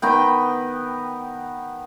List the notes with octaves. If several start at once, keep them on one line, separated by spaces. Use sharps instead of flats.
D#3 B3 G5